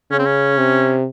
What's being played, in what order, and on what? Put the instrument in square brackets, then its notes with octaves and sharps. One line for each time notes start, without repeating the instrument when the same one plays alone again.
[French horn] C#3 [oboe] C#4
[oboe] C4
C#4
[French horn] C3